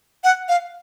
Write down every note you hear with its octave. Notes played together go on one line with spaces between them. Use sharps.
F#5
F5